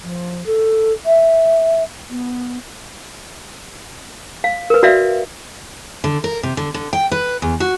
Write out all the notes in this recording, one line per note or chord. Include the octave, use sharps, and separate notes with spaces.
F3
A4
E5
B3
F5
A#4 B4
F#4 D5 E5 F5
D3
A#4
C3
D3
D3
G5
B4
E2
F#4